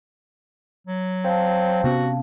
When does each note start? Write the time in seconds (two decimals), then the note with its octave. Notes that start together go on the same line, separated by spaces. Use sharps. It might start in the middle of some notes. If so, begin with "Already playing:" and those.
0.87 F#3
1.25 C4 F5 A5
1.84 C3 B3 C#4 F#4